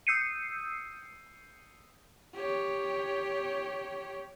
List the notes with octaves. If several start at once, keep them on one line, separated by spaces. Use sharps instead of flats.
D#6 E6 G6 C7 C#7 D#7
G4 C#5